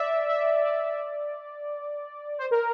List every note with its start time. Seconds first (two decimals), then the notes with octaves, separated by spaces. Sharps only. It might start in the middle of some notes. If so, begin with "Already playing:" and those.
Already playing: D5 E5
0.29 E5
0.64 D5
2.38 C5
2.51 A#4